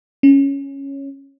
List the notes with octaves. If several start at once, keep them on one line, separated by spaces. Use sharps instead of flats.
C#4